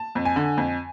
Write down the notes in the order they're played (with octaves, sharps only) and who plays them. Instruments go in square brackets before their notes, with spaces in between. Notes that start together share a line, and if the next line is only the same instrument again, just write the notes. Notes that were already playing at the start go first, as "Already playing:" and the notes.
Already playing: [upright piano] A5
F2
G#5
D3
F2